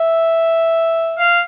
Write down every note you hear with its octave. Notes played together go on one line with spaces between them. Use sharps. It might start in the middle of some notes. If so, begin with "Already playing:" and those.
Already playing: E5
F5